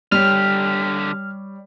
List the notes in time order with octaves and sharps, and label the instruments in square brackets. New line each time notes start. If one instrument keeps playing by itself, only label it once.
[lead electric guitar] D3 G4 [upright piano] G3 C#5 [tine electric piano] F6